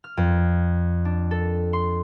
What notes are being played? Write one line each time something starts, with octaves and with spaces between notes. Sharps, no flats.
F6
F2
D4
A4
C6